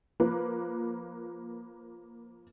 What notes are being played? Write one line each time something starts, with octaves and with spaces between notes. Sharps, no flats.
F3 A#3 B4